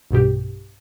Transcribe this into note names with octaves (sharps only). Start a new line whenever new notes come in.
B1 G2 B2 G4